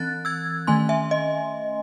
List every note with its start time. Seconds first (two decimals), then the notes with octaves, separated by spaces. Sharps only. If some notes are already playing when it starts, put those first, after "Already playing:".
Already playing: E3 C4 F#6 A6
0.25 E6 G#6
0.67 D#3 A3 C#4 G#5 C6
0.89 E5 G#5
1.11 D#5